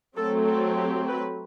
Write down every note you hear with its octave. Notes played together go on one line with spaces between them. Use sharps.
F#3 A3 C4 A4
A4
G4
B4